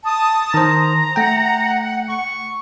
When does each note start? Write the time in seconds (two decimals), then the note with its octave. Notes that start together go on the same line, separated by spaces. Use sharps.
0.04 A5 D#6
0.54 D#3 C5 A#5
1.16 A3 F#5 G5
2.09 C#6